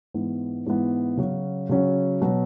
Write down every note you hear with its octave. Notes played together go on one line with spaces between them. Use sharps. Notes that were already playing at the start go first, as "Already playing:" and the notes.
G#2 E3 B3
G#2 E3 B3
C#3 F#3 C#4 F#4
C#3 F#3 C#4 F#4
B2 F#3 B3 F#4